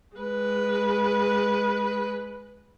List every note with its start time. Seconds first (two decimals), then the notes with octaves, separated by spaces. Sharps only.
0.17 G#3 B4